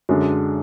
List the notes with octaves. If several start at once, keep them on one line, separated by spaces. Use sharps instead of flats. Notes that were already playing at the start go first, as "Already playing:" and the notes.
F#2 D3 G#3 D4